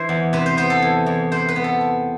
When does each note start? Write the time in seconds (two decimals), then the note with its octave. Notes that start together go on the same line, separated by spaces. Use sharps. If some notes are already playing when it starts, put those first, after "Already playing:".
Already playing: E3 C5
0.09 E2
0.33 C3 B4
0.46 C5
0.57 B3 C5
0.70 A4
0.82 E3
1.06 E2
1.32 C3 C5
1.49 B4
1.56 B3
1.64 A4
1.81 C4